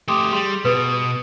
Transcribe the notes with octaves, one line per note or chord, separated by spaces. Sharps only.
A3 G4 C6 D6 D#6
G3 G#4 C6
B2 B4 D#6